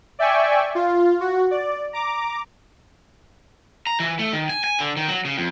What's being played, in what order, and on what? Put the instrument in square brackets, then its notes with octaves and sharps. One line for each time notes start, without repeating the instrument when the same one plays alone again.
[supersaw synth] D5 E5 G5 G#5 C#6
F4
F#4
D5
A#5 D6
[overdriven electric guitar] A#5
E3
A3
D#3
G#5
G#5
D3
D#3
F#3
C#3
F2